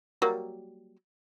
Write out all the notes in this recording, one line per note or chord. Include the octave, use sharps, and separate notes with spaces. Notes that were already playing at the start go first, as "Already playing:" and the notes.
F#3 G3 A#3